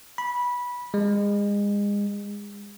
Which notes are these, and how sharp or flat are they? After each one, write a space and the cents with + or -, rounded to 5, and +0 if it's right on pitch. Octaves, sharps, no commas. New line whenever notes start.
B5 -15
G#3 -30